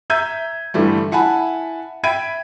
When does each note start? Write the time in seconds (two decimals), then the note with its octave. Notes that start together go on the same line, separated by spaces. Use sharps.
0.10 E5 A#5 E6 G6 G#6 D#7
0.74 G2 D3 E3 G3 A3
1.11 E4 F#5 G#5 A5 B5
2.03 E5 G5 B5 G#6 D7 D#7